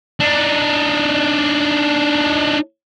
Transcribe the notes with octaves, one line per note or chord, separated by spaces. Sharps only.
D4 D#4